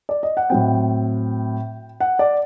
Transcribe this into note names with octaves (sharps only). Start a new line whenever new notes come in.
D5
D#5
F#5
A2 F#3 C4 G5
F#5
D5